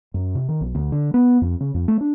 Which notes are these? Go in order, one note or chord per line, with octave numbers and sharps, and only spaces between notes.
F#2
C3
D#3
B1
D2
D3
B3
F2
C#3
F2
A3
D4